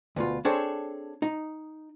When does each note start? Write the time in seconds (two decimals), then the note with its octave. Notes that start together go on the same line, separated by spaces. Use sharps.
0.16 D2 B2 F4
0.45 C4 D4 G#4 A4 C5 C#5
1.22 D#4